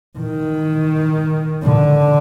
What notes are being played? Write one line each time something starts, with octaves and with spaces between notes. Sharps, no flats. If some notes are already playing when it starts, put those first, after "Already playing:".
D#3
D3